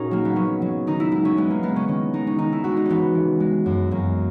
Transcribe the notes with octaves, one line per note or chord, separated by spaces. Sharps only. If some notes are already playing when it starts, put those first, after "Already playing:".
Already playing: A#2 C#4 D#4 F#4 G#4 A#4
F#3 A#3
B3
F#3 C#4
F#3
D#3 D#4
E4
G#3 E4
C#4
G#3 B3
A#3
G#3 B3
C#4
D#3 C#4
G#3 D#4
C#4
D#3 D#4
E4
G#3 F#4
D#4
E3 B3 C#4
E3
G#3
F#2
F#2 A#3